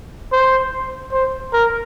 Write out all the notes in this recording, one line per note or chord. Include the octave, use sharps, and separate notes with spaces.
C5
C5
A#4